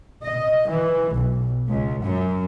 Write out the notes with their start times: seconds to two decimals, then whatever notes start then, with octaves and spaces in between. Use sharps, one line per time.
0.23 D#5
0.69 E3
1.14 B1
1.68 C#2
2.03 F#2